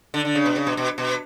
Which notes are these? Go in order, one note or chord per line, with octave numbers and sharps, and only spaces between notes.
D3
D3
C#3
B2
C#3
B2
B2
B2